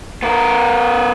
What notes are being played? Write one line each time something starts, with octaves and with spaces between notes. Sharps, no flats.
B3 A#4